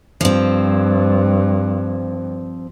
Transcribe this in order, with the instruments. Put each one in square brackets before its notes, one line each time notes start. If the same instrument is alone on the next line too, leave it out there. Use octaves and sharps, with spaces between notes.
[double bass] G2 [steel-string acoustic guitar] F3 C4